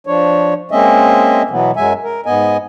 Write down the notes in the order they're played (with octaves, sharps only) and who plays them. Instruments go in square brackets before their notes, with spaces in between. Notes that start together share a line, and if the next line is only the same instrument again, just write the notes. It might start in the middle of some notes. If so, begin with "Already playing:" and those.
[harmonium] F3 D4 C#5
G#3 A#3 C4 C#4 D#5 E5
B2 E3 F#3 B3
F#2 F#3 G#3 E5 G#5
A#4
G#2 B3 D#5 G#5